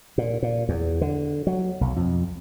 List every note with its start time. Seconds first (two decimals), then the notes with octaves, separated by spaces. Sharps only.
0.18 A#2
0.42 A#2
0.69 E2
1.01 D3
1.47 F#3
1.81 B1
1.96 F2